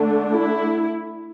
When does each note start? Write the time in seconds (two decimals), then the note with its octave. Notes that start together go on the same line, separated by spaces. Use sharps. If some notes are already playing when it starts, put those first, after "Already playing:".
Already playing: D3 A3 D4
0.31 E4